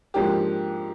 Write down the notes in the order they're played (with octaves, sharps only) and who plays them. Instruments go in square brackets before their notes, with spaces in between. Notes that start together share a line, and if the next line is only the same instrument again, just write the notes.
[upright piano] G#2 F3 A#3 D4 G4